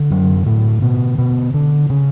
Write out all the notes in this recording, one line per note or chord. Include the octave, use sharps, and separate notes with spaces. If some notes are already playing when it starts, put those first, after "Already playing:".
Already playing: D3
F#2 F#3
A2 A3
B2 B3
B2 B3
D3 D4
C#3 C#4